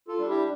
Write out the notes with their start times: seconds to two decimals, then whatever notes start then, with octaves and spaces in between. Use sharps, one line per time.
0.08 F4 A4
0.18 G3 D4
0.29 E4 G4